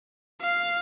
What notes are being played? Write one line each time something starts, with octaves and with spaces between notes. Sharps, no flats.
F5